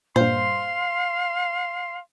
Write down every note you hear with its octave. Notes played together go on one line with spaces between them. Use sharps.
G2 A#2 C5 F5 C6